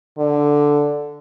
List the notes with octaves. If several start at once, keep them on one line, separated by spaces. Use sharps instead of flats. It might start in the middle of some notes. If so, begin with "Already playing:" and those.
D3